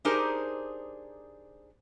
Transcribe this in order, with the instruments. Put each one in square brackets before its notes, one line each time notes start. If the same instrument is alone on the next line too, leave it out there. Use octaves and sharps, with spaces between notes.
[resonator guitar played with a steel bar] D4 D#4 G4 G#4 A#4 C5